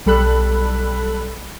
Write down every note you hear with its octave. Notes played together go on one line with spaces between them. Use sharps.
B1 G3 A4 B5 F#6